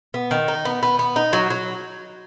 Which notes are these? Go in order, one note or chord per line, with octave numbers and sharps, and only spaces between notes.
B3
D#3
D#4
B3
B3
B3
D#4
F#3
F#3